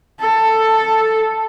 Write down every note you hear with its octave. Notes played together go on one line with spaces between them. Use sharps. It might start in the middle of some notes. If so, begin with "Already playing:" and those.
A4